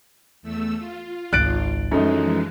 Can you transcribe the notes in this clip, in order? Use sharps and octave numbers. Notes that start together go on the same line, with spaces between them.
E2 A3 E6
F4
G#1 C#2 F#6 A6 D7
F#2 E3 F3 G#3 A3 D4 D#4